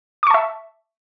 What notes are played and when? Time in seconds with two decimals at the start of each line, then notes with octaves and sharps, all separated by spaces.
0.23 D6
0.27 C#6
0.31 A5
0.34 E5